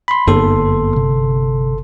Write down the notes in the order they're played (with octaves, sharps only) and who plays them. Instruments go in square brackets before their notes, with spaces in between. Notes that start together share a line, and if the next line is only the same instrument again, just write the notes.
[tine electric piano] B5 C6
[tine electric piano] G1 A4 C6 [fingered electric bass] F#2 A#3 B3
[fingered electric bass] C3